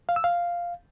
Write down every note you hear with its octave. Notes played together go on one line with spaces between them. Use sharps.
F5
E6
F5